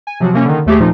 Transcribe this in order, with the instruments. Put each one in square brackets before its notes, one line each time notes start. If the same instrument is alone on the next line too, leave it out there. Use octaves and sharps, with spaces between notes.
[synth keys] G#5
C3 F3 F#3 F#4
C3 A#3 C#4
D3 D#3
D#2 A3 G4 G#4
A#2 F3 D#4